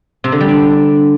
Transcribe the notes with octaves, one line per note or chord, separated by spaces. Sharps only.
C3
D3
G3
D4